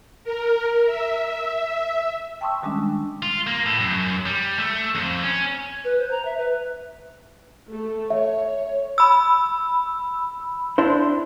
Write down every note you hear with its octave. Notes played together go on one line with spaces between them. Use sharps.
A#4
E5
G5 A5 C6 C#6 D#6 E6
D#3 G3 G#3 C#4 D4
F4
A#3
A2
F#2
G3
A3
F2
C#4
B4
C5
A#5
E5
B4
A3
C#5 E5
B5 E6
D4 E4 C5